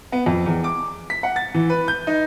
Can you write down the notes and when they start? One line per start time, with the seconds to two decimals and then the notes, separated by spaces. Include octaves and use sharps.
0.12 B3
0.26 F2
0.46 E2
0.64 D6
1.10 B6
1.23 F#5
1.36 A6
1.54 E3
1.70 B4
1.88 G6
2.07 D#4